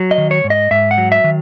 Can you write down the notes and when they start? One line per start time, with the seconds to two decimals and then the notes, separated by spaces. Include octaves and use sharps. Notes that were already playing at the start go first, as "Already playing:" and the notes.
Already playing: F#3
0.11 D#5
0.18 D#3
0.31 C#5
0.44 G#2
0.50 D#5
0.71 G#2 E5
0.91 F#5
0.98 F#3
1.12 E5
1.24 D#3